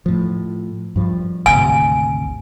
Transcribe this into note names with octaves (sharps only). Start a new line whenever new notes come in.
A2 F3
G2 F3
G#1 D2 C3 G#5